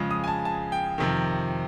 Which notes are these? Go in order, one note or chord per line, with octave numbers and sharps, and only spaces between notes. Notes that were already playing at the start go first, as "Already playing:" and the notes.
Already playing: F2 C#3 F3 G#3
D#6
G#5
A5
A5
G5
F2 C3 D#3